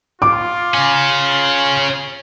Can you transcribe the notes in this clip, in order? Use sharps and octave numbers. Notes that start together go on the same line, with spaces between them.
F4 D6
C#3 C#4